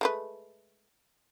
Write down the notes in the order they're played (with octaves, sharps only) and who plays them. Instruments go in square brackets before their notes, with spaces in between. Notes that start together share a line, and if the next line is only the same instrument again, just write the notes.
[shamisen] G#3 A3 B4